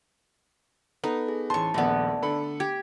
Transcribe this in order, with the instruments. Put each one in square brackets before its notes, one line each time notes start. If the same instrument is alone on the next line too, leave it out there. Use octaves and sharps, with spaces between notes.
[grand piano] B3 [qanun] D#4 [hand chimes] A4
[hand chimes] G#4
[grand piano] A1 C6 [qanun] C5 C#6 [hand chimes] A5
[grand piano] D#1 A#1 [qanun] A3 B3 [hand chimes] D5 A5
[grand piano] D3 A4 B5
[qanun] G4 [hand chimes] G#6